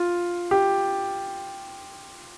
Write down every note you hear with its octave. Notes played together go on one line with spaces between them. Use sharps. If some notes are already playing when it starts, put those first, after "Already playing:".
Already playing: F4
G4